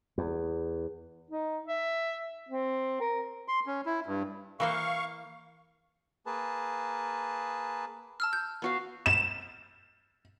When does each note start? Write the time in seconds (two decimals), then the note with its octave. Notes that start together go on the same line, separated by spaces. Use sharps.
0.18 E2
1.31 D#4
1.68 E5
2.49 C4
3.00 A#4
3.48 C6
3.66 C#4
3.86 E4
4.06 G2
4.60 E3 A#3 C5 F5 C#6
6.26 A#3 G#4 B4 A5
8.20 A5 E6 F6
8.33 G6
8.62 B3 F#4 F5
9.06 E7